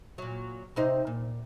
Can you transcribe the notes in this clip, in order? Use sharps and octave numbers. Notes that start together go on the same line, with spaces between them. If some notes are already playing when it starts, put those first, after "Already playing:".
A#2 F#3
C3 D#4 C5
A#2